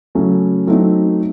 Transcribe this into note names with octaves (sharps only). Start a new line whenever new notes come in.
C#3 F#3 A3 C#4
F#3 A3 C4 D#4